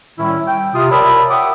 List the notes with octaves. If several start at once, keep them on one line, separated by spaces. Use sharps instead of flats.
A2 D#3 G3 C#4 E4
G5
C3 F4 D#6
A#4 C#5 D5 E5 A5 B5
E5 F#5 G5 D6 D#6